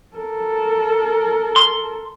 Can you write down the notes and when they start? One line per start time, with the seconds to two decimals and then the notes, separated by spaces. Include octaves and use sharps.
0.16 A4 A#4
1.56 C6